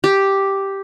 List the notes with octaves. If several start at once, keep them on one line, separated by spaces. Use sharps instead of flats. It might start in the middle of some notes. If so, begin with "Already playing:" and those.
G4